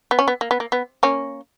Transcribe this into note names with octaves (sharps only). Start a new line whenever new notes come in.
B3
C#4
B3
A#3
B3
A#3
B3
A#3 C#4